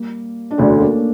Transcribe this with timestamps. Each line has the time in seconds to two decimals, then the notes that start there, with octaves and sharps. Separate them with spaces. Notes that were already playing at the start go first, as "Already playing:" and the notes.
Already playing: G3 A#3
0.51 D4
0.58 E1 D2 D3 A3 C#4
0.80 A#3 D4